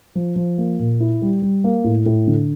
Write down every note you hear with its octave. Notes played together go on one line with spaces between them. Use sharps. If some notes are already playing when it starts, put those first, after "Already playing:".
F3
F3
A#3
A#2
E4
G3
G3
A#3
A2
A2
D3